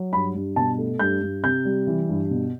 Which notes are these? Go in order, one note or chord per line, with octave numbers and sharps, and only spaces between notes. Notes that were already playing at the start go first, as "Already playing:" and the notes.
Already playing: F#3
G2 B5
G2
B2 A5
A3
G2 G6
G2
C3 G6
G3
E3
G2
B2